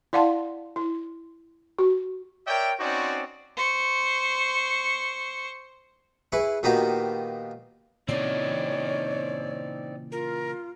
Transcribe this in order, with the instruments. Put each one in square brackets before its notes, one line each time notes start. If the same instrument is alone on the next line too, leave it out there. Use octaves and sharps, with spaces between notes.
[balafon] E4 D5 F5 F#5 A5 C6
E4
F#4
[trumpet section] A#4 C#5 D5 E5 G5
C4 C#4 D#4 F#4 C5 D5
[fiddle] C5 C#6
[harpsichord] E4 G#4 B4 C#6
A#2 D#3 B3 F#4 G4
[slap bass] A#2 C#3 E3 [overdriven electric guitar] C4 D#4 [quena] C#5 [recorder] D5
[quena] F4 [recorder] A#4